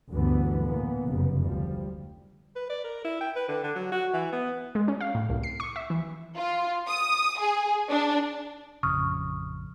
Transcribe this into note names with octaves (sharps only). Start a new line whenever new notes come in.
D2 G2 D3 E3 F#3 B3
A2 E3 A#3 B3
F1 F#2 C#3
D2 F3 G3
B4
D5
A#4
E4
G5
B4
D3
D3
F#3
F#4
E3
B3
G#3
C#4
F5
A2
C2
C7
C#6
E5
E3
F4
D#6
G#4
D4
A1 F2 C#3 C#6 D#6 F6